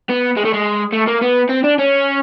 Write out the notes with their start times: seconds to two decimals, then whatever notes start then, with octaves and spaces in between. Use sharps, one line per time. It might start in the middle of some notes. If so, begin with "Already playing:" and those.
0.09 B3
0.37 G#3
0.45 A3
0.54 G#3
0.93 A3
1.08 A#3
1.22 B3
1.49 C4
1.64 D4
1.79 C#4